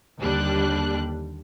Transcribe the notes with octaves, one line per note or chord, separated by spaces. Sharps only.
D#2 D3 G3 D4 F#6